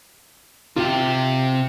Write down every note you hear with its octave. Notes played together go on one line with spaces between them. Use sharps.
C3 F4 G4